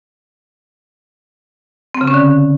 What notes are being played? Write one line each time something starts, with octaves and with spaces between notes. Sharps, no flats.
C4
C#3
C#4
D3